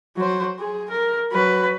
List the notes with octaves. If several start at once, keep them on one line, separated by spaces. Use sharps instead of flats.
F#3 C5
G#4
A#4
F#3 B4